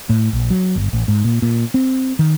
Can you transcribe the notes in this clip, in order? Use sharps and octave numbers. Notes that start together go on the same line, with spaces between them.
A2
A#1
F#3
G1
A1
G#2
A#2
A#2
C4
D#3